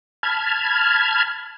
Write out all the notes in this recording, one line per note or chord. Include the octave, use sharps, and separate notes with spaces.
A5 B5 F6 G#6